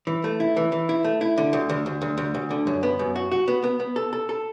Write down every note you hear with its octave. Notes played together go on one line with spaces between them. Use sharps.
E3
A3
E4
E3
E3
E4
A3
E4
D3
D2
D2
D2
D2
D2
D2
D3
F#2
B3
F#2
F#4
F#4
B3
B3
B3
A4
A4
A4